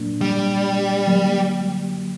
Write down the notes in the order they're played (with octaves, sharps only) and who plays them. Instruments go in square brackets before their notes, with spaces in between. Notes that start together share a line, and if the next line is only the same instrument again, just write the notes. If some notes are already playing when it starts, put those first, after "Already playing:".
Already playing: [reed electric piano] A#2 F#3 A#3 D4
[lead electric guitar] G3
[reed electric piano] D3 F#3 A#3